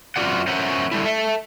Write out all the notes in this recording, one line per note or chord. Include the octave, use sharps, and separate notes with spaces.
F#2 C4 F4 F#4 D5 F#5
C#4 A#4 C5 C#5 E5 F#5
D3 G3 A3 E4
A4 E5